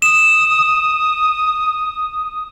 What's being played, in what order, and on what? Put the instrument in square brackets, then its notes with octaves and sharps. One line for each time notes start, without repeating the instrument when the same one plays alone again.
[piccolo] D#6 [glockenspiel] E7